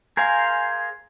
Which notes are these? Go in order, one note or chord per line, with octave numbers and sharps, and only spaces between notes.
G#4 A#4 C5 F5 G#5